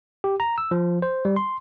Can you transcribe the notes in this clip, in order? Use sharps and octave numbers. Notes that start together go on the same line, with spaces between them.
G4
A#5
E6
F3
C5
G3
C6